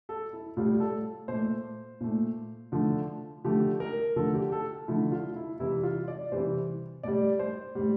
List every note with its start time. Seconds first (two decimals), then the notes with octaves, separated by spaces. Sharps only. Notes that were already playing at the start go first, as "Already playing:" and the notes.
0.09 A4
0.33 E4
0.57 A2 G3 F4
0.80 A4
1.28 A#2 A3 C5
2.01 A#2 A3
2.72 D3 F3 A3
3.44 D3 F3 A3 G4
3.80 A#4
4.16 D3 F3 A3 A4
4.34 G4
4.52 A4
4.88 D3 F3 A3 E4
5.12 F4
5.36 E4
5.60 C3 E3 G3 E4
5.83 F4
6.08 D5
6.32 C3 E3 G3 C5
7.03 A2 G3 D5
7.39 C5
7.75 A2 G3